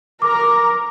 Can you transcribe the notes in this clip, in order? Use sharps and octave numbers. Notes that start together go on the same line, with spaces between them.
A#4 A#5 D6